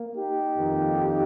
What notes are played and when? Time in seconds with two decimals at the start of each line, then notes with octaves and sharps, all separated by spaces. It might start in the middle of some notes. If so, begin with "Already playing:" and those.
Already playing: A#3
0.17 D#4 G4
0.57 F2 D#3 A#3